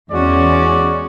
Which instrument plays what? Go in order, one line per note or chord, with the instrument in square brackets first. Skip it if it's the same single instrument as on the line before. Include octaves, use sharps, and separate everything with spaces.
[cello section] E2 C#4 [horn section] G#3 F#4 D5